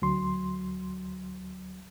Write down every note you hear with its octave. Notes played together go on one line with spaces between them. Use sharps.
D2 F#3 C6